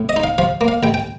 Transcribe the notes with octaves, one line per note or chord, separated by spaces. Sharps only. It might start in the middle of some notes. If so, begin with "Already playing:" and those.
Already playing: A2
D#5
D#4
F5
F3 F5
A#3
F5
A1 G5
G5